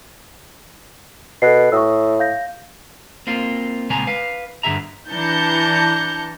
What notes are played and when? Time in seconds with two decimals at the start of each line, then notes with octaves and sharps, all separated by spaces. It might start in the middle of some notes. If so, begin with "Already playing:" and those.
1.42 B2 A4 F#6 C7
1.72 A2 C#6 D#6 E6
2.20 F5 G6 A#6
3.27 A#3 C4 F4
3.90 A#2 C#3 G#3 C4 G#5 A#5
4.07 B4 F5
4.63 G2 D3 F#4 G#4 E5 A#5
5.10 E3 D4 A5 A#5 G6 C#7